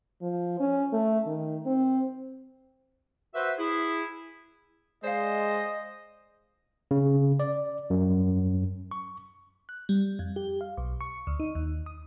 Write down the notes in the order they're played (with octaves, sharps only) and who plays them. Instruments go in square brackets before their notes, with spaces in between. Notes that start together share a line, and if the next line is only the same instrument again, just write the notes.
[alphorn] F3
C#4
A3
D#3
C4
[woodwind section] F#4 B4 C5 E5
E4 G#4
[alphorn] G#3 [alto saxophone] C5 [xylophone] D5 F5 [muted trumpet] D#5
[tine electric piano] C#3
D5
F#2
C#6
[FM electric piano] F#6
G3
F2
G4
F5
B1
C#6
D2
D#4
D#2
D#6